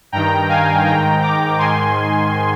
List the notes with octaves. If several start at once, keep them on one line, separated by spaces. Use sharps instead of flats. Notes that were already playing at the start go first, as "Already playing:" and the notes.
G2 D#3 G5 A#5
F5 G#5
G#2 D#3 G5 A#5
A#5 D6
G#2 D#3 G#5 C6